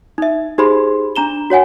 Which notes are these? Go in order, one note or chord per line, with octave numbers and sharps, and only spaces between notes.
D#4 E5
D#4 G4 G#4 C5 B5 C6
D4 A#5 E7 G7
F#4 C#5 F#5 G#5